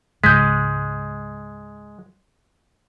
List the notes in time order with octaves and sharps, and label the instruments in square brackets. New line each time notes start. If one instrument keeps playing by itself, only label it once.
[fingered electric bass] C#2 G#2 [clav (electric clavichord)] G#3 [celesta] G6 B6